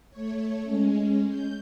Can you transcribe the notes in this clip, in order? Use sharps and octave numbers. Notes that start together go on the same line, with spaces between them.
A3 C#5
G#3 C#4
G6